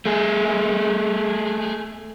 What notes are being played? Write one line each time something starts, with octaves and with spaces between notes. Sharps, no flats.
A3 G#4